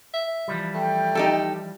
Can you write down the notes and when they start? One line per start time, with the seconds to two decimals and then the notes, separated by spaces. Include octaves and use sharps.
0.14 E5
0.48 E3 F3 G3
0.74 A3 G5
1.15 D#4 G4 A4